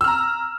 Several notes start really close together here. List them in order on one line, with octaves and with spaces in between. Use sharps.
E6 F6 A#5